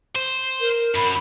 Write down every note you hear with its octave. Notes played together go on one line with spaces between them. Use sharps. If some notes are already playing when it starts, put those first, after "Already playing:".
C5
A#4
F#2 B5